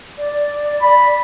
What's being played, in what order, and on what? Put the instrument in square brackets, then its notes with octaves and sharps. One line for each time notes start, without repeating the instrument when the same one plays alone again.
[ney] D5
[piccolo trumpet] B5